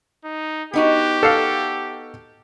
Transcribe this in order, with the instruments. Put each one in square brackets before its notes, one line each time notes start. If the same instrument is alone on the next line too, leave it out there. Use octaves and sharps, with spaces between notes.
[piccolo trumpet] D#4
[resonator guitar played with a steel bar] B3 D#4 F#4 [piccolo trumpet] G4
[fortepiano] A4 F5